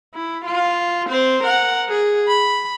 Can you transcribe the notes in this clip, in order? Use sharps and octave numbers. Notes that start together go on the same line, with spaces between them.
E4
F4
C4 C5
A#4 F#5
G#4
B5